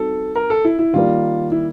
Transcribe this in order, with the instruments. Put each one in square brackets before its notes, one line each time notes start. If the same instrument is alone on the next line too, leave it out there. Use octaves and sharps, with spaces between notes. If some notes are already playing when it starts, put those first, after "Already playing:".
Already playing: [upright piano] G3 C4 D#4 F#4 [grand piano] A4
[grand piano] A#4
A4
E4
E4
[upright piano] D#3 G3 A#3 [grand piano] F4
[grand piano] E4